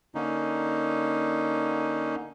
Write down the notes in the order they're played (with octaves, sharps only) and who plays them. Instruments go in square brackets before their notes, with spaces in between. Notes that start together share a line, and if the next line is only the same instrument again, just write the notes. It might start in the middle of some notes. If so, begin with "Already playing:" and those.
[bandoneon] D3 A#3 C#4 D#4